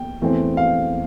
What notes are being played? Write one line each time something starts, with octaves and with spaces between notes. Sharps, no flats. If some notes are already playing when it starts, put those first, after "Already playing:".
Already playing: G5
E2 E3 A3 C4
F5